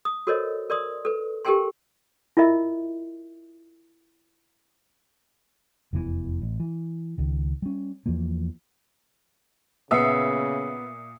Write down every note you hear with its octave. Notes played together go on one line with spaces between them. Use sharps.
D#6
F#4 A4 A#4 C5 C#5 D#5
A#4 D5 C6 D#6
A4 B4
G4 A4 A#4 G5 G#5 C6
E4 F4 A#4 D#5 E5
F1 E2 A2 E3
A1
E3
C#2 D#3
G3 C#4
E2 E3 F3 A#3
A#2 C#3 B3 E5 D#6 E6 C7 C#7